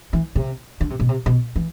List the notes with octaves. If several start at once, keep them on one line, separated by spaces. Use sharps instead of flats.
E3
C3
D3
C3
B2
C3
B2
E3